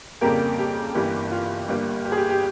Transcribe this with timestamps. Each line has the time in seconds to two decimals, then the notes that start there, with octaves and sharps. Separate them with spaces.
0.21 F2 C#3 G3 A#3 G4 A#4
0.58 G4
0.94 G1 G2 E3 G3 A#3 G4
1.31 F4
1.69 G1 G2 G3 A#3
2.05 G4
2.12 G#4
2.17 G4
2.31 G4